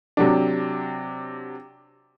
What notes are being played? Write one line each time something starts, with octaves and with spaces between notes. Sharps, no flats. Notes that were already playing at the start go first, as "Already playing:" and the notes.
C3 F#3 D4